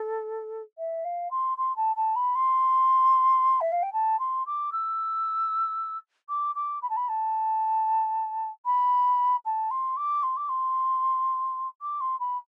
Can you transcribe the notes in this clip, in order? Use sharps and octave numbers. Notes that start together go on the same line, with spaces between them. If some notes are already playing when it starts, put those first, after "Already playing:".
Already playing: A4
E5
F5
C6
C6
A5
A5
B5
C6
E5
F5
G5
A5
C6
D6
E6
D6
D6
B5
A5
B5
A5
B5
A5
C6
D6
C6
D6
C6
D6
C6
B5